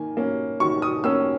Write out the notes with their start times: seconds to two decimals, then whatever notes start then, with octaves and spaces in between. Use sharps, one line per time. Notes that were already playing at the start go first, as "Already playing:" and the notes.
Already playing: D#3 A#3 G#5
0.17 A#3 C#4
0.60 D#3 C#6
0.82 D#6
1.04 A#3 C#4 E6